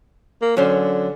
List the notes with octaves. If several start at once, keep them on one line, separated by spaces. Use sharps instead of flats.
A#3
D3 F#3 C#4 C5